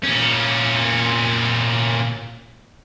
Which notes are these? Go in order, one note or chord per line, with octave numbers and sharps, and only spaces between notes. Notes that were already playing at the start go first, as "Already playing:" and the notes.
A#2 C#4